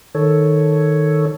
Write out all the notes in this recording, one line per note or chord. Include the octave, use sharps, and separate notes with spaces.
D#3 A4 C#5